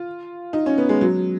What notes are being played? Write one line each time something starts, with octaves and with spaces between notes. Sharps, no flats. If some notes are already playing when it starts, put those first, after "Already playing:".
Already playing: F4
D#4
C#4
B3
G#3
F#3